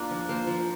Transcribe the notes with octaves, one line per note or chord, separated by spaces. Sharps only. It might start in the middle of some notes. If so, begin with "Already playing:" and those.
Already playing: A#3 D4 F4 A#5
F3
A#3 F4 C5
F3